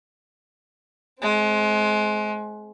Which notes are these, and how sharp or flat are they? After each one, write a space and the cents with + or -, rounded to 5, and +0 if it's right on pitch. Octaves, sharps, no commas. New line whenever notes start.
G#3 +30 C4 +0